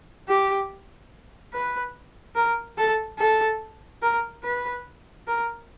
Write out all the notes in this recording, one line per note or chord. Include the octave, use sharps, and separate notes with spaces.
G4
B4
A#4
A4
A4
A#4
B4
A#4